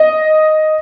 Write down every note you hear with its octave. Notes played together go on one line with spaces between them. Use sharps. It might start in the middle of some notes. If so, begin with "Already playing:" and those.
Already playing: D#5